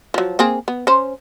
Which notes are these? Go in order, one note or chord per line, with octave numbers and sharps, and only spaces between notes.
F3 F#3
A#3 C4 G#4
B3
C#4 C5